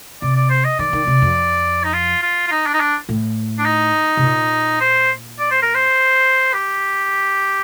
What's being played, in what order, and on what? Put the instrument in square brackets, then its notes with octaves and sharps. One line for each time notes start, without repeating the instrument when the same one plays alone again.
[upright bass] C3 [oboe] D5
[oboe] D5
C5
D#5
[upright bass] D#3 [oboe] D5
[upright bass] D#3
C3
F2
[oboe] D#4
F4
F4
F4
D#4
D4
D#4
D4
[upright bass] A2
[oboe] D4
D#4
[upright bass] C3
A#2
[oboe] C5
D5
C5
A#4
C5
G4